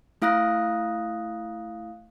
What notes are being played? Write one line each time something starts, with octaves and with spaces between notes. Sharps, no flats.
A3 E4 F5 D#6 F#6 A#6